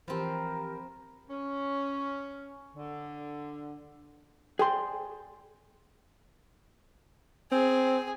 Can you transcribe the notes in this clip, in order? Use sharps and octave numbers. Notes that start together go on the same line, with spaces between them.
E3 F3 C4 G4 A#4 A#5 B5
C#4
D3
G#4 C5 D5 G5 C6
C4 G#4